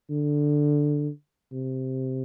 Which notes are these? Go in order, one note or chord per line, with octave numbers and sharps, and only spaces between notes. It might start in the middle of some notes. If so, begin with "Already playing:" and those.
D3
C3